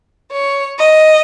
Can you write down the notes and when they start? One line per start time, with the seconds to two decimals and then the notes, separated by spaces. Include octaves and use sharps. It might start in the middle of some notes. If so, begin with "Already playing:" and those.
0.32 C#5
0.79 D#5